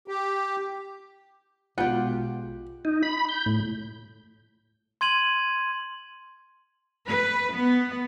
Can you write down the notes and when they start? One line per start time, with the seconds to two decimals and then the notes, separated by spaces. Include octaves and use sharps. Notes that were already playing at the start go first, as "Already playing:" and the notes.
0.08 G4
1.78 A#1 B2 G#3 B3 F4 G4 F#5
2.85 D#4
3.03 B5
3.29 G6
3.46 A2
5.01 C6 G#6 D#7 F#7
7.07 B4
7.53 B3